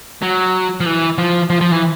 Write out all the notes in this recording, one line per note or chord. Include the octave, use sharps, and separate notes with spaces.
F#3
F3
E3
F3
F3
F3
E3